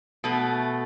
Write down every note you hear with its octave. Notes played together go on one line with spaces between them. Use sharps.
B2 A3